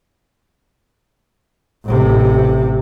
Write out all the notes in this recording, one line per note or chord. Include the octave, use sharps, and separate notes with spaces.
A1 C3